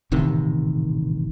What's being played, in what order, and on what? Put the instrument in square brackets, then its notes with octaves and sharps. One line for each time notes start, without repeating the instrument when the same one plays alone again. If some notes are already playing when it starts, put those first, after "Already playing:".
[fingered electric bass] D#1 A1 C3 D#3